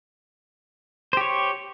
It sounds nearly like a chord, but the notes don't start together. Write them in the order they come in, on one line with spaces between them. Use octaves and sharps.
C5 G4 C#5